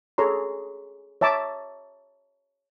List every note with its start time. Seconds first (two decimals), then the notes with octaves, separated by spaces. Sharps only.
0.18 G#4 A4 C#5 A#5 C6
1.21 C#5 E5 A5 A#5 D6